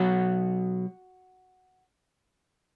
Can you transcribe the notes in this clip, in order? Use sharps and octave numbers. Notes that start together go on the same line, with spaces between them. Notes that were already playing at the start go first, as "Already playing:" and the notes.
Already playing: B2 F#3 F#4